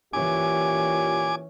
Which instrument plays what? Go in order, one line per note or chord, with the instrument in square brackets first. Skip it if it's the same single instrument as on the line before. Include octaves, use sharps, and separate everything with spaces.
[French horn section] A#2 F4 G4 [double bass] E3 C#4 [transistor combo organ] G#5 D6